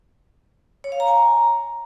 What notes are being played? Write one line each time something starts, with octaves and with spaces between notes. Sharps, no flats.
C#5
F5
A#5
G#5
A#5